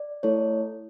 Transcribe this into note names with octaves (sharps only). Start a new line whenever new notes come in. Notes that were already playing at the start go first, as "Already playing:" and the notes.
Already playing: D5
A3 E4 A4 C#5